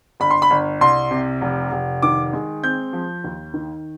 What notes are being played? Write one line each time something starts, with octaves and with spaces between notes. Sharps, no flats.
G1 B5
C6
B5
G1
C2 C6
C3
F1
F1
D#3 D6
G#3
C4 G6
F3
D#2
D#3